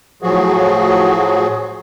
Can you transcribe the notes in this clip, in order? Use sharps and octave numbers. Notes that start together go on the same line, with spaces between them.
A2 F3 F#3 F#4 G#4